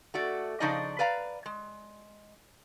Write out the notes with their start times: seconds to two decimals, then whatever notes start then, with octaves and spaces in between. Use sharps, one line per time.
0.14 A3 F#4 D5
0.60 C#3 F3 D4 D#4 D5 D#5
0.99 B4 D5 F5 A#5
1.46 G#3